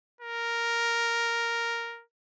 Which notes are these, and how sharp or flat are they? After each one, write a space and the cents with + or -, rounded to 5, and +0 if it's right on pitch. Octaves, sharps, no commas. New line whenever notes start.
A#4 +0